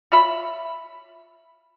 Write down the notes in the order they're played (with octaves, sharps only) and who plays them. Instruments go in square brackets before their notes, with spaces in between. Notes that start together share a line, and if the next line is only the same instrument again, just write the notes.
[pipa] F4 C#5 E5 B5